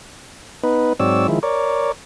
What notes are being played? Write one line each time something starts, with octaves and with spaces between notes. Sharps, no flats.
B3 D#4 B4
G#2 F#3 C4 C#5 D5 E6
D#3 F3 G#3 E4
A#4 C#5 D5